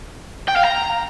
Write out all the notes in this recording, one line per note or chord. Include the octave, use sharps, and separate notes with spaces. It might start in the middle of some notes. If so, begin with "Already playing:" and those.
G5
F5
A#5